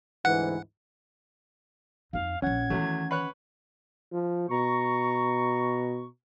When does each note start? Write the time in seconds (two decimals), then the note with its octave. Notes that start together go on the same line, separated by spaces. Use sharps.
0.25 D2 G#2 E3 F#5
2.13 F2 D#4 F5
2.42 A#1 F3 C#4 F#5 G#6
2.70 E2 D#3 E3 F#3 A3
3.11 B4 C#5 F#6
4.12 F3
4.50 B2 A#5 C#6